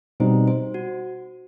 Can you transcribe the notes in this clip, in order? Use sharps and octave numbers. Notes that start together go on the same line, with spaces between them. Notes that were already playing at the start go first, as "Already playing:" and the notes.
B2 G3 C4 D#4 C5
C5
F#4